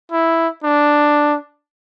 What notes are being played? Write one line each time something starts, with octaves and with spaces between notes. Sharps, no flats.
E4
D4